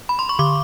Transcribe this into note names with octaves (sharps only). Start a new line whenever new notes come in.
B5
C6
C#6
D3 D6